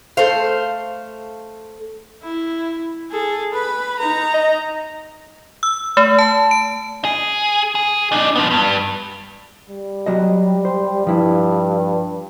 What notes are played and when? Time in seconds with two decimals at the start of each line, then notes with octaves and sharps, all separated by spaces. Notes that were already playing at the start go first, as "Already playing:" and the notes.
0.17 A3 C5 F5
2.23 E4
3.11 G#4 A4
3.54 B4 B5
3.99 D#4 A#5
4.34 D#5
5.63 E6
5.97 A3
6.19 A5
6.51 D7
7.05 G#4
7.75 G#4
8.12 D4 D#4
8.36 F3 B3
8.51 G2
9.69 G3
10.06 F#3 F#4 D#5
10.65 C5
11.07 G2 F3 E4